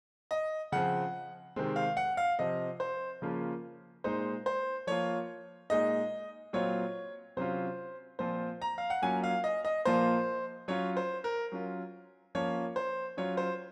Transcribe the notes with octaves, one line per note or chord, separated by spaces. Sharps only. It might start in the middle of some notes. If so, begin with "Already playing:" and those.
D#5
C#3 F3 C4 F#5
C3 D#3 G#3 C4
F5
F#5
F5
C3 F3 C4 D#5
C5
C#3 F3 A#3 C#4 F4
A#2 G#3 D#4 C5
C5
F3 A#3 F4 C#5
A#2 G#3 D#4 D#5
A#2 F#3 C4 F4 C#5
C3 F#3 C#4 F4 C5
A#2 F3 C4 F4 C5
A#5
F5
F#5
F#3 A#3 C#4 F4 G#5
F5
D#5
D#5
A#2 F3 A#3 F4 C5
F#3 C#4 F4 C#5
C5
A#4
F#3 C#4 F4
F3 A#3 C#4 F4 C#5
C5
F#3 C#4 F4 C#5
C5